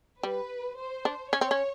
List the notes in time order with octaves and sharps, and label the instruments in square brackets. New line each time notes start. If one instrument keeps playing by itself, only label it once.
[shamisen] G3 [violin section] B4
[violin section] C5
[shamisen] D4
[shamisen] C#4 [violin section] C#5
[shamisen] C4
C#4